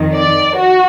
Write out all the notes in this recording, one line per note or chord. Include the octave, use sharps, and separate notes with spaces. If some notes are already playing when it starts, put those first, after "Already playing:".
Already playing: F2 D#3
D5
F#4